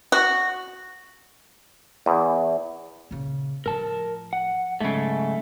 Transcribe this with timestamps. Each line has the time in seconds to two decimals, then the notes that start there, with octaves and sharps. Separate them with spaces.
0.12 F#4
2.06 E2
3.11 A#2 C#3
3.66 A2 F3 A#4 A5
4.33 F#5
4.81 G#2 C#3 F#3 A3